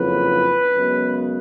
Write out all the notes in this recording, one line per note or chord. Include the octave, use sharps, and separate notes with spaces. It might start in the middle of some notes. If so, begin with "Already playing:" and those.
Already playing: F#1 F2 C#3 F#3 B4
F#2 C#3 G#3 B3